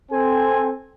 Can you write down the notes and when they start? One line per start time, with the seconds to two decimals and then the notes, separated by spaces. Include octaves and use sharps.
0.12 C4 A4 G#5